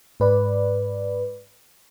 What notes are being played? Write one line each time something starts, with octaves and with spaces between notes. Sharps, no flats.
G#2 B4 D5